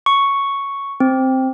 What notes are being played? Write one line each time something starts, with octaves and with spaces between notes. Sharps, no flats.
C#6
C4